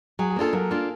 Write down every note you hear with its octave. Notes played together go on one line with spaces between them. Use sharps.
F#3 G#4
G#4
A#3 D4 F4 A4
F#3 A#4
A#3 D4 F4